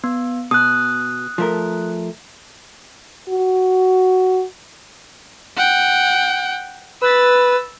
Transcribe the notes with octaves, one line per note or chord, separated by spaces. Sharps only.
B3
B2 D#6 F#6
F3 A3 A#4
F#4
F#5 G5
B4 E6 A6